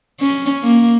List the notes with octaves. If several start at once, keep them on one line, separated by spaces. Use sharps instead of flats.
C#4
A#3